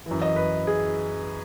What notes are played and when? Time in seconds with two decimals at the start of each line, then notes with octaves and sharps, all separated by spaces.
0.06 F#2 E3
0.22 D#5
0.36 B4
0.67 G#4